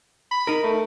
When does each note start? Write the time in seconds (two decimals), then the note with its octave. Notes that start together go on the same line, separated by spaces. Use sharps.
0.31 B5
0.47 D#4 A#4
0.63 A3